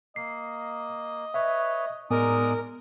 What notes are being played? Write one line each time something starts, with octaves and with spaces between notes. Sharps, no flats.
A#3 D#5 C7
B4 C#5 E5
A2 G#3 B3 D#4 A#4 D5 G#5 D#6